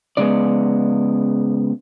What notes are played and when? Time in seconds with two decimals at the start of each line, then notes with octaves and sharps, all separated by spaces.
0.17 C#3 G#3 B3 D5